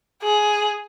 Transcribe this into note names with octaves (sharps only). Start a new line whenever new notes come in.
G#4